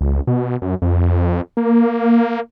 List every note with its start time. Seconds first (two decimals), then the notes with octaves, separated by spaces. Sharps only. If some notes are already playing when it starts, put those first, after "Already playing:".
0.01 C#2
0.27 B2
0.62 F#2
0.82 F2
1.57 A#3